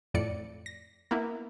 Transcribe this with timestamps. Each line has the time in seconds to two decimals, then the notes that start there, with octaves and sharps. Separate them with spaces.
0.14 F2 A2 D5 C#7
0.66 A#6
1.11 A#3 B3 E4